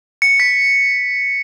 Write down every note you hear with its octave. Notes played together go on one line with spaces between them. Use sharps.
C#7
B6